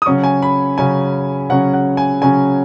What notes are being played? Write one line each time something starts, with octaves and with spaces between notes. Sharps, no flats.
D#6
C#3 F#3 C#4 C#6
G#5
B5
C#3 F#3 C#4 G#5
C#3 F#3 C#4 F#5
F#5
G#5
C#3 F#3 C#4 G#5